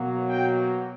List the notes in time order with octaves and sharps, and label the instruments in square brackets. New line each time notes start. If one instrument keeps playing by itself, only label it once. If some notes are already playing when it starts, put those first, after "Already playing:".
Already playing: [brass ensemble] B2 F#3 A#3
G5